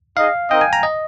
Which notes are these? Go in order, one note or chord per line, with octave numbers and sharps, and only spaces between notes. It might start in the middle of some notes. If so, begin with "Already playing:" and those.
D#4 G#4 D#5 F5
C4 D#4 A#4 D#5 G5
G#5
A#5
D#5